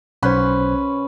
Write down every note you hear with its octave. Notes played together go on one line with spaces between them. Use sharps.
B1 C#4 B4 C5 C6